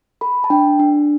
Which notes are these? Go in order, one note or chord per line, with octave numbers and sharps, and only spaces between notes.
A4 B5
A5
D4 G5
D4